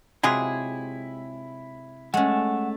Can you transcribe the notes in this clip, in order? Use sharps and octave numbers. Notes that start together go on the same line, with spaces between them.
C3 F#3 G#3 E4 F4 G#4
G#3 A3 C#4 F#5